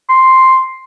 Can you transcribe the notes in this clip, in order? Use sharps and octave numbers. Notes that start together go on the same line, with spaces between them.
C6